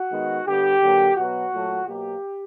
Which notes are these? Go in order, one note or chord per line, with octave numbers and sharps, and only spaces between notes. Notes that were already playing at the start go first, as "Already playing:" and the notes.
Already playing: F#4
D#3 G#3 B3
D3 G3 B3 G4
D3 F#3 A#3
B2 F#3 B3 F#4
A#2 F#3 A3
B2 F#3 A#3 G4